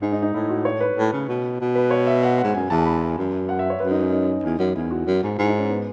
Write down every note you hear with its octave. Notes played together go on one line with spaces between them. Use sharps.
G#2 D#4
D#4
D#4
A2 E4
F#4
C#5
B4
A2
C#3
B2
B2
B4
C#5
E5
F#5
F#5
G#2
F#2 G#5
E2 A5
B5
F#2
F#5
E5
C#5
F#2 B4
D#4
C#4
D#4
E2
F#2
E2 E4
F#4
F#2
G#2
G#2 E4
D#4
C#4
B3